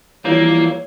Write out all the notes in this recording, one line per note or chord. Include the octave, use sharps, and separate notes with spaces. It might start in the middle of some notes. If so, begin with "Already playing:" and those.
E3 F3 G3 A#3 C#5